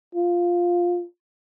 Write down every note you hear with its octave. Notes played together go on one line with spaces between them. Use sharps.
F4